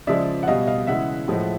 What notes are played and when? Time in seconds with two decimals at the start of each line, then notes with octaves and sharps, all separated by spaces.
0.07 C#3 F3 G#3 D5 E5
0.43 F#5
0.48 B2 G3 D#5 F5
0.67 D#5 F5
0.87 C#3 E3 G#3 E5 F#5
1.28 A2 F3 G#3